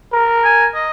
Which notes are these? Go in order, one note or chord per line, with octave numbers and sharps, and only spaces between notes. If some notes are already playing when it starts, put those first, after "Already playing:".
A#4
G#5
D#5